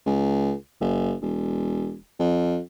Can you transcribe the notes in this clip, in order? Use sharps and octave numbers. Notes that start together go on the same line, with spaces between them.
C#2
F#1
E1
F2